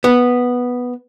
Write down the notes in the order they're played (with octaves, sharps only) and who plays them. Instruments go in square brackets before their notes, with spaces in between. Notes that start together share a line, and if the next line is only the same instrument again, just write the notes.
[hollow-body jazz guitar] B3